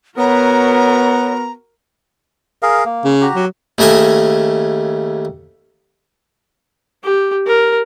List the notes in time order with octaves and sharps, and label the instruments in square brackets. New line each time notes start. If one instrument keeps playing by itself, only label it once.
[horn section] B3 [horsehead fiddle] F#4 A#4 [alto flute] C#5 [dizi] A#5
[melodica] G#4 A#4 F5
A#3
[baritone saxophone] C#3
[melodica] F#4 G4 A#5
[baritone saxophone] F#3
[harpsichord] D#2 C#3 A3 D#5 G#5 D#6
[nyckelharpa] G4
A#4